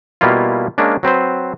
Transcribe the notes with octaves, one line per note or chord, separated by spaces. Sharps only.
B2 G3 A#3 E4 F4
G#3 A#3 C#4 D4
F#3 C4 B4 C5